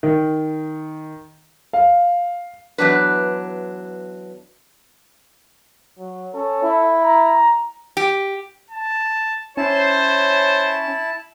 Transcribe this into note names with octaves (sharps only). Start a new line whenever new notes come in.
D#3
F5
E2 F#3 D4 B4
F#3
C#4 A4
E4
A#5
G4
A5
C#4 E4 C5 A5